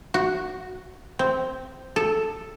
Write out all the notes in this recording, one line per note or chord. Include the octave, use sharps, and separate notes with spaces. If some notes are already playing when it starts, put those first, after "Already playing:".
F#4
C4
A4